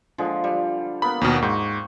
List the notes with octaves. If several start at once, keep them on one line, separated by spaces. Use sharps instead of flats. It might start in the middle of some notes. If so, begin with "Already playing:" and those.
D3 F3 G#3
G3
A#3 B3 B5
D#2 B2 A#3 F#4
G#2 G5 B5 C#6